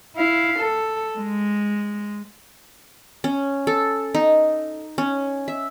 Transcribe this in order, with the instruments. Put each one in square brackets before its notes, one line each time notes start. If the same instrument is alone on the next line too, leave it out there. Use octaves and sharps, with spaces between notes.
[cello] E4 F5
A4
G#3
[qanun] C#4
A4
D#4
C#4
E5